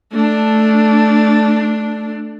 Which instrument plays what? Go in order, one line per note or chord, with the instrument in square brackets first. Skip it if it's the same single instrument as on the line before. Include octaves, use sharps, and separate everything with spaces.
[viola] A3 D4